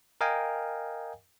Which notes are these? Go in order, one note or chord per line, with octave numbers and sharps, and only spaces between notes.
A#4 D#5 F5 G5 G#5